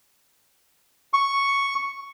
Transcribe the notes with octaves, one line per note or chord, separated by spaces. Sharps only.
C#6